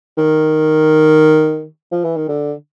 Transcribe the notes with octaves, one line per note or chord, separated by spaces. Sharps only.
D#3
F3
E3
D#3
D3